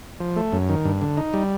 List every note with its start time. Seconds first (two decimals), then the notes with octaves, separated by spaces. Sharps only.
0.20 F3
0.36 A3
0.53 F#2
0.69 D#3
0.85 G2
1.01 D3
1.17 D#4
1.34 G3